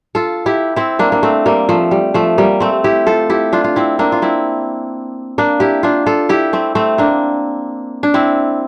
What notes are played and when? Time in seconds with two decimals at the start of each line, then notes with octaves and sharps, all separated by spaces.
0.15 F4 A4
0.46 E4 G4
0.76 C4 E4
0.99 A#3 D4
1.12 A#3
1.23 A3 C4
1.46 G3 A#3
1.69 F3 A3
1.91 G3
2.14 F3 A3
2.38 G3 A#3
2.60 A3 C4
2.84 E4 G4
3.07 F4 A4
3.30 E4 G4
3.53 D4 F4
3.64 F4
3.76 C4 E4
3.99 A#3 D4
4.12 F4
4.22 C4 E4
5.38 A#3 D4
5.60 E4 G4
5.83 D4 F4
6.06 F4 A4
6.29 E4 G4
6.53 A3 C4
6.75 A3 C4
6.98 A#3 D4
8.03 D4
8.14 C4 E4